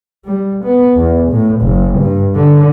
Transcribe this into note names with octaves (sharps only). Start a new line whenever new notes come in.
G3
B3
E2
A2
F#1
G2
D3